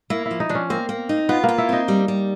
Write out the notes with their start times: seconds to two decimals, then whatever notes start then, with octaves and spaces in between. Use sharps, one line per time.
0.10 A#3 E4
0.26 E4
0.31 F3
0.40 D#4
0.49 F3 D4
0.55 C#4
0.70 A#3 C4
0.89 A#3
1.09 D#4
1.29 B3 F4
1.44 A#3 F4
1.58 E4
1.69 C4 D#4
1.88 G3
2.08 G3